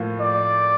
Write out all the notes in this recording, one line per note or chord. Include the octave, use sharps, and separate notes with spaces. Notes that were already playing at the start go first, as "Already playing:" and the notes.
Already playing: A2 F3 A#3 F4
D5